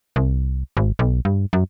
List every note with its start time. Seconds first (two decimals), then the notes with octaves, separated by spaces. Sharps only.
0.16 C2
0.77 G#1
0.99 B1
1.25 G2
1.53 F#2